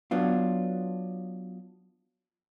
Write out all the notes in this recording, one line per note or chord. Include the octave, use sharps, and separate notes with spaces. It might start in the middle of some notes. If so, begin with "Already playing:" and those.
F#3 B3 D4 F4